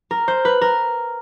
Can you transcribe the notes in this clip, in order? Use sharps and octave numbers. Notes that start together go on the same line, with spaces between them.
A#4
C5
B4
A#4